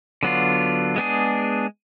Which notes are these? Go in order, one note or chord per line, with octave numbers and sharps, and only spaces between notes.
D3 F#3 B3 D4 F4
G#3 B3 D4 G#4